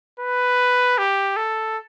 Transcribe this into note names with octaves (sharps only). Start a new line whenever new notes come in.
B4
G4
A4